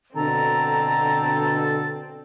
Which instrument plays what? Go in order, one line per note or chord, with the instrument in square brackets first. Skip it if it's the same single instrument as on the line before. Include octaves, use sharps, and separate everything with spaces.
[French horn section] B2 D3 [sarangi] C4 [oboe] A4 [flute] A#5